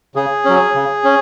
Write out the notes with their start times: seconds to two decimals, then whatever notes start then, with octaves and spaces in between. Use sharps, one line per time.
0.15 C#3 G#4
0.45 F#3 C#4
0.74 C#3
1.04 C#4